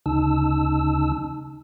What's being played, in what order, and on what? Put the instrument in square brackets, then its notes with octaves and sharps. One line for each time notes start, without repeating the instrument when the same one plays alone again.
[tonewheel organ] D2 C#3 D#4 A5 E6